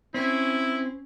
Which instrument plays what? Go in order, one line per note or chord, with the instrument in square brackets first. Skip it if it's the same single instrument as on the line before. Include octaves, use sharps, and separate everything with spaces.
[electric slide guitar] C4 [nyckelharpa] C#4 [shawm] E4